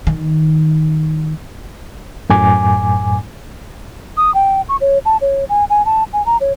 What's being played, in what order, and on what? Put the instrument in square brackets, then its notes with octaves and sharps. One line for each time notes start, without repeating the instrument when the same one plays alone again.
[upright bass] D#3
[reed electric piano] F#2 A2 G#5 D6
[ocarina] D#6
G5
C#6
C#5
A5
C#5
G#5
G#5
A5
G#5
A#5
C#5